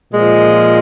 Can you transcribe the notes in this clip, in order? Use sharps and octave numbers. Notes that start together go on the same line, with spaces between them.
A#2 F3 G#3 D#5